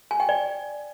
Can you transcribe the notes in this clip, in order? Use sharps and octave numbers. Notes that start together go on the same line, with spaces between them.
G#5
G5
D5